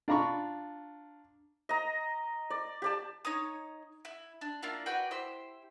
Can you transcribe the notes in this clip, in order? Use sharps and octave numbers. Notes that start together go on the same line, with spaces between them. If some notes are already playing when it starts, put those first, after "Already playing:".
D4 F4 A#5 B5 C#6
D#5 A#5
D5
G4 D5 A5
D#4 C#5 D#6
E4
D4
A#3 D4 E4 F4
F#4 B4 D5 G5
E4 G4 C5 E6